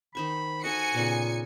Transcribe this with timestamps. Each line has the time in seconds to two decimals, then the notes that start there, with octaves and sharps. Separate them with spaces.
0.15 D#3 D#4 C5 B5 C#6
0.64 D#4 F#4 A4 D#5 G#5 C#7
0.94 A#2 C#3 B3